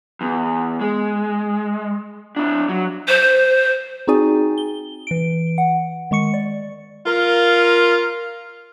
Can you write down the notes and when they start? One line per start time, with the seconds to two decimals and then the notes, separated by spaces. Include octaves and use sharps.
0.21 E2
0.81 G#3
2.36 D4 E4
2.69 F#3
3.08 C5
4.07 C4 D#4 F#4 G#4 D5 G#5
4.58 G7
5.07 E3 D7
5.58 F#5
6.11 D#3 G#3 C#6 C#7
6.34 D5
7.06 F4 A#4